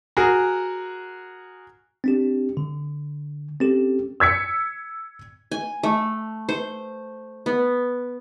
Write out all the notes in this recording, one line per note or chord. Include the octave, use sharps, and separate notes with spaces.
F#4 G#4 A#4
C4 D4 G4
D3
C4 C#4 G4 A4
E6 G#6 B6 C#7
G#5
A3
C5
B3